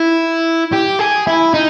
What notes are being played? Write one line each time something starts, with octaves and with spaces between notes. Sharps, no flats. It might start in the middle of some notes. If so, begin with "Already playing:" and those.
Already playing: E4
G4
G#4
E4
D#4